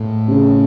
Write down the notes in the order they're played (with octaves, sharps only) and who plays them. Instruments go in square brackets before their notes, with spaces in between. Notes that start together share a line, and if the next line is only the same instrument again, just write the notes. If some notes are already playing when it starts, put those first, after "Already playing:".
Already playing: [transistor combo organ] A2
[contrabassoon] C3
C#3